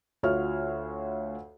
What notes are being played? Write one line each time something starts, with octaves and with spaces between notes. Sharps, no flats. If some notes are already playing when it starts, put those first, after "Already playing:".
D2 F4 F#4 C#5 F6